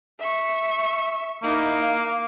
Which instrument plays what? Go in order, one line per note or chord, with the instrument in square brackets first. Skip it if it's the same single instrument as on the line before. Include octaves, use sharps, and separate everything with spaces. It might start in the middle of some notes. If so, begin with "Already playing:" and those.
[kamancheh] E5 C#6
[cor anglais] A#3 [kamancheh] D#4 E4
[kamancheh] F5